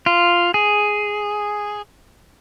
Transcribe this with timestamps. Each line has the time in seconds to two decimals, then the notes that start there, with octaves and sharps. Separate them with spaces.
0.06 F4
0.54 G#4